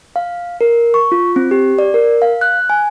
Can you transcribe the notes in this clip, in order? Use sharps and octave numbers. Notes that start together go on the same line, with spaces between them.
F5
A#4
C#6
F4
C4
G4
D5
A#4
F5
F#6
G#5